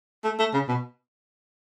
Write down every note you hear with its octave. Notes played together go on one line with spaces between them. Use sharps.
A3
A3
C#3
B2